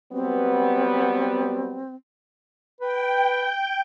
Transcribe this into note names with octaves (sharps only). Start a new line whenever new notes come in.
F#3 G3 B3 C4
B4 G5